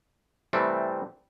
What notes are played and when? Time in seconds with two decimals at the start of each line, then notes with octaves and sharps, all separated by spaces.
0.53 C3 E3 G3 A3 C4